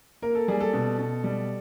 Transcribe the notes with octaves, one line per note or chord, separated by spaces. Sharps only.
A#3 A#4
A4
G3 G#4
A4
B2
B2
G3